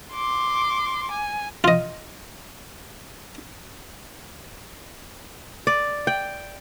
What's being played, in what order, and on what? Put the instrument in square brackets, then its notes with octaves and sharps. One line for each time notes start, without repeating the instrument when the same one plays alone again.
[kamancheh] C6 D6
G#5
[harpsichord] F4 D#5
[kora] D5
G5